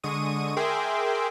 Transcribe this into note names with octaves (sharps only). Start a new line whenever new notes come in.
D3 G#3 C#6 D#6 D#7
G#4 A#4 E5 G5 C6 D6